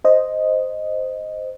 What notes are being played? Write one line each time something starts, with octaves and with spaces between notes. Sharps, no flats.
C5 D#5